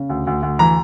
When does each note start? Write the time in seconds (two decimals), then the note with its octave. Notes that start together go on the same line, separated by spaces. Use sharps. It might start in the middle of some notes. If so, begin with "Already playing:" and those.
Already playing: C#3
0.10 D2
0.27 D2
0.43 D2
0.59 E3 A#5